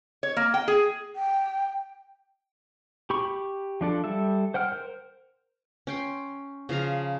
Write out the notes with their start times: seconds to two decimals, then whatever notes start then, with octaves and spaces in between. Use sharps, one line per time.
0.23 C#5
0.37 A#3
0.54 G5
0.68 G#4
1.16 G5
3.10 G4 B5 C#6
3.81 F3 D4 A4
4.04 G3 A4 E5
4.54 C5 F#5 G5 F6
4.72 A#4 C5
5.87 C#4 G5 C6
6.69 C#3 F3 F5 A#5